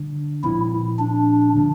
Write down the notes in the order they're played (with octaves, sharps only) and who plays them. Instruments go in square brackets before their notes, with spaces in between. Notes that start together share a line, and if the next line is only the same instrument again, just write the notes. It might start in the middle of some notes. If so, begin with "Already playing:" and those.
Already playing: [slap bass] D3 G3 D4
[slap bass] A#2 F3 C4 [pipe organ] E4
[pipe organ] D4
[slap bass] D3 F3